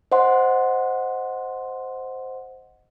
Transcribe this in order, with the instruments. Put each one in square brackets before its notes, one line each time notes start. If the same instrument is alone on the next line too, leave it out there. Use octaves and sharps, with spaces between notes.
[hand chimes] C5 D#5 F#5 C6